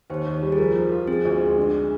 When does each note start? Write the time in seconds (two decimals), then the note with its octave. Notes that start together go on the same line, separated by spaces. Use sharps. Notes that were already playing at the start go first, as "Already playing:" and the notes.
0.10 D#2 C5
0.26 D#2
0.43 G3
0.52 G#4
0.58 F3 A#4
0.75 F3
0.92 F4
1.07 C4 G#4
1.25 D2
1.41 G#3
1.57 D4